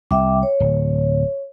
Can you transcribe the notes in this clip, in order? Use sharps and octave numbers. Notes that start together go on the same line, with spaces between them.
C2 E5 G5 D6
C#5
D1